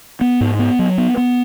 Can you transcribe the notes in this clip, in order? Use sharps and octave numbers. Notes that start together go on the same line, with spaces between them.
B3
G#2
B3
F#3
B3
B3